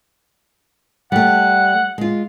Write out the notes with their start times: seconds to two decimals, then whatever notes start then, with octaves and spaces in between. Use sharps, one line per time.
1.12 G3 A3 F#5
1.98 G#3 F4